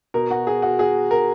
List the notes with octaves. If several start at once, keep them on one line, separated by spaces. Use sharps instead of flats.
B2 A#4
F#4
G#4
F#4
G#4
A#4